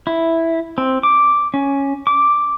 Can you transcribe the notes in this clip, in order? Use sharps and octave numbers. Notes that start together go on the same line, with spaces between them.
E4
C4
D6
C#4
D6